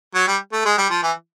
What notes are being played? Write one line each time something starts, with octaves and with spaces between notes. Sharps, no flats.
F#3
G3
A3
G#3
G3
F3
E3